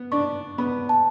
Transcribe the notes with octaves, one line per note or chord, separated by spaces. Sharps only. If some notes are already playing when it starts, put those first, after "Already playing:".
Already playing: B3
D4 C#6
B3 B5
A5